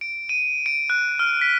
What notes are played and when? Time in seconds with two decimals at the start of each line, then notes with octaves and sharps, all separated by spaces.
0.01 D7
0.29 D#7
0.66 D7
0.90 F#6
1.19 F6
1.41 B6